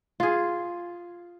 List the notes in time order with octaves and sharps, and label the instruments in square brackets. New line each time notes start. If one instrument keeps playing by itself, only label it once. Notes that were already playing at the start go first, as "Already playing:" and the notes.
[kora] F4 G#4